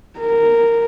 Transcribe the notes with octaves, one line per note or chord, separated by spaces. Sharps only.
A#4